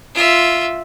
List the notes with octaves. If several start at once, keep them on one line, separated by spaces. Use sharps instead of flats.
F4 E5